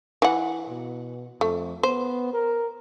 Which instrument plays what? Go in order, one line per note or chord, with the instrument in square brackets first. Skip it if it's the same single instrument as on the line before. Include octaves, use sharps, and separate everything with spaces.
[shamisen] E3 F#5
[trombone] B2
[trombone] F2 [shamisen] A3
[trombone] B3 [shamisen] C5
[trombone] A#4